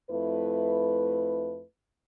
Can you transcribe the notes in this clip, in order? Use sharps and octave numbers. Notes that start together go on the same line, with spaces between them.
F2 A3 E4 B4